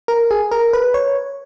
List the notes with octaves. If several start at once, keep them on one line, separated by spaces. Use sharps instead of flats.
A#4
G#4
A#4
B4
C#5